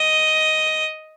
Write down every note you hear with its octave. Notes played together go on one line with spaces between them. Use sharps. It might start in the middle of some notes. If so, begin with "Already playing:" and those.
Already playing: D#5